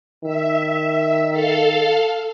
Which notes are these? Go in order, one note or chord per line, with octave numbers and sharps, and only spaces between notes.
D#3 E5
A4 F5